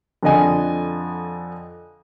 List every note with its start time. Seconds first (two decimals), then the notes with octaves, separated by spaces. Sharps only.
0.23 F2 D3 D#5 G#5